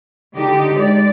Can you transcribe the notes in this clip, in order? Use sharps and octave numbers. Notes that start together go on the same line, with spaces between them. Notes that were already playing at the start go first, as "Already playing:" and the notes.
D3 D#4 G4
G#3 D5